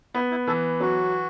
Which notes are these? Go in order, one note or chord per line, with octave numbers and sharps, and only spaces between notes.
B3 E4
E4
E3 A4
F#3 F#4